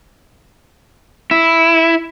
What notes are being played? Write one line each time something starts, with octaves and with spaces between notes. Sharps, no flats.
E4